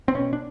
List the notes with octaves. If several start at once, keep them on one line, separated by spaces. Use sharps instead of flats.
C4
B2 C#4
D4